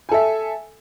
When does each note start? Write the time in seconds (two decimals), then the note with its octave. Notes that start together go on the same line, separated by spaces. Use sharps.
0.09 G#5
0.11 A4
0.14 E5